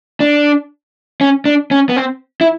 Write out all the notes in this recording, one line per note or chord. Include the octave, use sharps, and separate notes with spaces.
D4
C#4
D4
C#4
B3
C4
E4